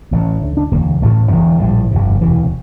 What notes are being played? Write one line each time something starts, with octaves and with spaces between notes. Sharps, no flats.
A1 A2
D2 D3
D4
E1 D2 D3 A#3
A1 A2 A3
E1 E2 D3
A#1 A2 G3
G1 F2 C3
E1 D2 C3 E3